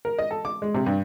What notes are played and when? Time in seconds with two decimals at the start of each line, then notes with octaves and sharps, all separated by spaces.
0.05 A#4
0.19 D#5
0.31 A4
0.45 D6
0.62 G#3
0.75 C3
0.86 G2